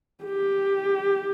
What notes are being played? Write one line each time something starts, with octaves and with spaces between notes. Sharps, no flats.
G4